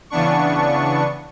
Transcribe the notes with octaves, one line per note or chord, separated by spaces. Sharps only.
C#3 E3 B3 D4 C#6